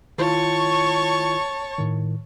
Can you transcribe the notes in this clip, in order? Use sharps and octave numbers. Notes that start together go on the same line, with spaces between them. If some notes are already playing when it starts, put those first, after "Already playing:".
D#3 E4 F4 C#5 A5 C#6
A2 D#3